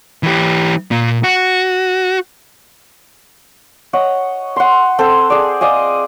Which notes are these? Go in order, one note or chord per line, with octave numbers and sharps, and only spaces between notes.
E3 G4
A#2
F#4
C#5 D#5 F#5
F#5 C6
C4 A4 C5
G#4 D5
D5 D#5 F5 G#5